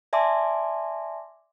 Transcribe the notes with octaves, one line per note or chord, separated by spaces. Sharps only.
D5 E5 G#5 A5 C6 D6